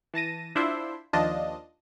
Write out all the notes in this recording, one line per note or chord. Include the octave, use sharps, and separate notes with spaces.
E3 A5 A#6 D#7
D4 E4 F4 C5 E5 C6
D#2 F3 D4 F4 D#5 A5